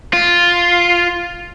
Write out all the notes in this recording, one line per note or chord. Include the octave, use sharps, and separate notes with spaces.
F4